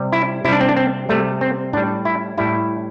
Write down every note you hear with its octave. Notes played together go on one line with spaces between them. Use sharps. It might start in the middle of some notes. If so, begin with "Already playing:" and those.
Already playing: C3 G3
E4
C3 G3 D4 E4
C4
D4
C4
C3 G3 A3
C4
A2 G3 D4
E4
A2 G3 E4